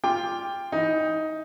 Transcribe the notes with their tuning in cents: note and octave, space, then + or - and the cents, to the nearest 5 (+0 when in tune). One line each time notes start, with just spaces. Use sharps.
F4 +0 G5 +15 D6 +0
E3 -5 D#4 +15